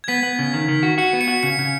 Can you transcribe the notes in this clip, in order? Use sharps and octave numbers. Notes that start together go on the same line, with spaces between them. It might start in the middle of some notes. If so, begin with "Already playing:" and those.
G#6
B3 B6
B3
C#3
D#3
D#3
F#4
F#4 C#7
B3
C#7
F#4
C#3 C#7
C#3